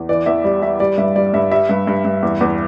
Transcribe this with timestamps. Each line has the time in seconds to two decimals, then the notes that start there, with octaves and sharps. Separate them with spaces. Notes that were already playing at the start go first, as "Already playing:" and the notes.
Already playing: E2
0.09 E3 D5
0.26 E2 E5
0.44 G3 D5
0.62 G3 E5
0.80 G3 D5
0.98 G2 E5
1.16 G3 D5
1.34 G2 E5
1.52 G3 E5
1.69 G2
1.87 G2
2.05 G2
2.23 E2
2.41 E2